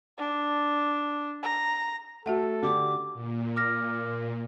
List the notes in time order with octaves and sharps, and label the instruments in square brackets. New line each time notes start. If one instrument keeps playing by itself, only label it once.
[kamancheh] D4
A#5
[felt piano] A3 [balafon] F#4 E5 F#5 [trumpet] A4
[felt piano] D3 G4 [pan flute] D6
[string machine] A#2
[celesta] D6 F6 A#6